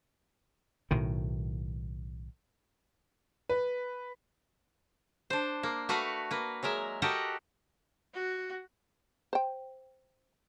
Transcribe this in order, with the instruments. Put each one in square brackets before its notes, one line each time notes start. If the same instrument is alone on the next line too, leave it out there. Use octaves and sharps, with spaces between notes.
[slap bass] B1 A2 D#3
[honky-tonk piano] B4
[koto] D4 C5
A#3
A3 F#4 B4 F5 F#5
A#3 B4
F#3 G#3 A#4 E5
F#4 G4 A4 A#4 D#5 F#5
[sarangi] F#4
[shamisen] C5 G5